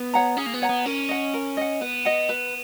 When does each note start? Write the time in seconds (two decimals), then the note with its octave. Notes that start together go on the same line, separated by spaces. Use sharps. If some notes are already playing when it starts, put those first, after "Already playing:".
Already playing: B3
0.14 C#5 F#5 A#5
0.37 C#4 G#4
0.46 A#3
0.54 B3
0.62 C#5 F#5 A#5
0.69 B3
0.86 C#4 A#4
1.09 D#5 F#5
1.33 A#4
1.57 D#5 F#5
1.81 B3 B4
2.05 D#5 F#5
2.29 B4